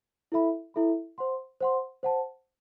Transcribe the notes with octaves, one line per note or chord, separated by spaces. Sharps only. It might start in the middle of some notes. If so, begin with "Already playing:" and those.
E4 A4 E5 B5
E4 A4 E5 B5
C5 F#5 C6
C5 F#5 C6
C5 F#5 A5